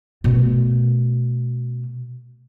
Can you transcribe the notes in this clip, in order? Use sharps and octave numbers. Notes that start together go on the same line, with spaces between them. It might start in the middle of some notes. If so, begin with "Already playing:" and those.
B2 A3